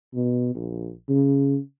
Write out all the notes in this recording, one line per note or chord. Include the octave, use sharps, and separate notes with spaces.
B2
A#1
C#3